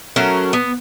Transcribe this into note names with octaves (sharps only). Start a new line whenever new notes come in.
F#3 A3 C#4 A#4
B3